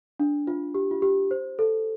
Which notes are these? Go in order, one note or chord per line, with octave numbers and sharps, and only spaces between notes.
D4
F4
G4
F4
G4
C5
A4